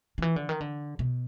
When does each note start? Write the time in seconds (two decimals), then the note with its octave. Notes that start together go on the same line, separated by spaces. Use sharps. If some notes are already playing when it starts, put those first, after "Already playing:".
0.18 D#3
0.22 E3
0.36 D3
0.49 D#3
0.61 D3
0.99 B2